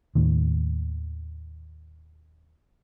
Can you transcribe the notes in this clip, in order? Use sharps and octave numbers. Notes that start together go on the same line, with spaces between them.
D#2 A2 D#3